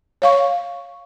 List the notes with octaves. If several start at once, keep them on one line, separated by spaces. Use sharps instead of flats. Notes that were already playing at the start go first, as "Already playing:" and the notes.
C#5 F5 C#6